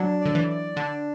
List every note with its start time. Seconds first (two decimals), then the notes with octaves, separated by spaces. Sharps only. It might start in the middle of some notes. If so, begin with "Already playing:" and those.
Already playing: F#3 D4
0.21 D3 D5
0.35 E3
0.50 D5
0.76 D3 D4